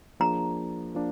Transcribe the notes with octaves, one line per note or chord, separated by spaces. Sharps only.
F3 A#3 D4 G#4 A#5
F3 A#3 D4